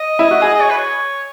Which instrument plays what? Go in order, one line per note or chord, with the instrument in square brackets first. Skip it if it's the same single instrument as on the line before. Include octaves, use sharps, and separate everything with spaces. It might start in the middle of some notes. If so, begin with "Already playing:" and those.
Already playing: [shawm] D#5
[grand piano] E4
F#4
G#4
[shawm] D#5
C#5
B4
C#5